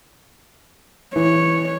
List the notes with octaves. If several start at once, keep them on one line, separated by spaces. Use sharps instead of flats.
E3 C#5